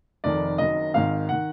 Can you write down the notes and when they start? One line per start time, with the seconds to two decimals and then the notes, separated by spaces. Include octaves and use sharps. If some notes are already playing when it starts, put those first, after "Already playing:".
0.24 F1 F2 D#3 D5
0.58 F#1 F#2 D#3 D#5
0.94 G#1 G#2 D#3 F5
1.29 D#3 F#5